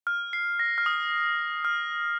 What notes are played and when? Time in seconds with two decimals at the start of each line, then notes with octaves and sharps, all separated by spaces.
0.07 F6
0.33 C7
0.59 A#6
0.78 F6
0.86 D#6
1.65 F6